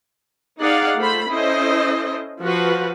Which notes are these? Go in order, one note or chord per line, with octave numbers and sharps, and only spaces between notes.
D#4 G#4 D5 F5 F#5
A3 F4 C5 B5
C#4 E4 A4 C5 D#5
F3 F#4 B4